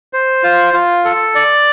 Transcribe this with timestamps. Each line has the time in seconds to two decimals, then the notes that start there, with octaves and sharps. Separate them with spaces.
0.13 C5
0.43 F4
0.74 F4
1.05 A4
1.35 D5